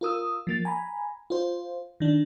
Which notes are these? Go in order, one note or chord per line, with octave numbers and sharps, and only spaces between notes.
F4 A#4 D#6 E6
F3 A#3 A6
G#5 A#5 B5
F4 C5
D#3 D4